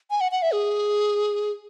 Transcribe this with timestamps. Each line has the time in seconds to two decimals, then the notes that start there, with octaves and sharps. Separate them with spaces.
0.10 G#5
0.21 F#5
0.32 F#5
0.42 E5
0.53 G#4